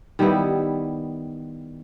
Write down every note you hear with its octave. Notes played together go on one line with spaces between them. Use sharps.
D#3 G3 B3 E4